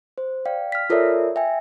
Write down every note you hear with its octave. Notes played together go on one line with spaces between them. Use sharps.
C5
D5 F5 G5
F6 B6
F4 A4 A#4 C#5 D5 E5
E5 G5 G#5